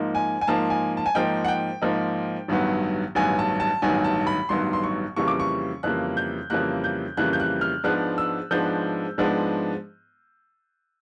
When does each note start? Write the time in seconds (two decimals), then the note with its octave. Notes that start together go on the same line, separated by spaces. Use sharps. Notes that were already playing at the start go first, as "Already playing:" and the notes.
Already playing: G#2 F3 A#3 D#4
0.15 G#5
0.41 G#5
0.48 G#2 F3 A#3 D#4 A5
0.70 G#5
0.97 A5
1.06 G#5
1.15 G#2 F3 A#3 D#4 G5
1.45 F#5
1.48 G5
1.82 G#2 F3 A#3 D#4
2.48 A1 G2 D#3 F#3 B3
3.15 A1 G2 D#3 F#3 B3 G#5
3.39 A5
3.60 A5
3.82 A1 G2 D#3 F#3 B3 G#5
4.04 A5
4.27 B5
4.49 A1 G2 D#3 F#3 B3 C6
4.73 C6
4.84 C#6
5.16 F2 C#3 E3 G3 A#3 C#6
5.28 D6
5.40 C#6
5.83 F2 C#3 E3 G3 A#3 F#6
6.17 G6
6.50 F2 C#3 E3 G3 A#3 F#6
6.84 G6
7.17 F2 C#3 E3 G3 A#3 F#6
7.33 G6
7.40 F#6
7.61 F6
7.84 G#2 F3 G#3 B3 D4 F#6
8.18 E6
8.51 G#2 F3 G#3 B3 D4 G6
9.18 G#2 F3 G#3 B3 D4